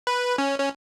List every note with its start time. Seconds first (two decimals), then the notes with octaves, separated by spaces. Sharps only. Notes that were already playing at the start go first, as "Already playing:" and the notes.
0.07 B4
0.38 C#4
0.59 C#4